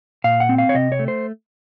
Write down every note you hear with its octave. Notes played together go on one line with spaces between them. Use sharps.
A#2 F5
F#5
C4
F5
C#5
C3 D#5
C#5
A3
C5